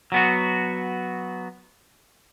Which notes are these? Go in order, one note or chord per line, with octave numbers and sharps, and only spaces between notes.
F#3 B3 F#4